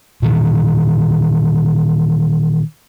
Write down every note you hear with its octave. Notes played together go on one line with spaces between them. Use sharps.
A#2 D#3 E3